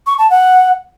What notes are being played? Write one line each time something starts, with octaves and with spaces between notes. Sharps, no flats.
C#6
A5
F#5